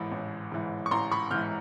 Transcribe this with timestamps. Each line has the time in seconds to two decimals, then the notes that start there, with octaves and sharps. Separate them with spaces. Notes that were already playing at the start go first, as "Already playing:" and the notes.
Already playing: A1 G#2 E3 B5
0.11 A1
0.52 G#2 E3
0.86 C#6
0.91 A1 A#5 C6
1.11 B5 C#6
1.31 G#2 E3 F6 G6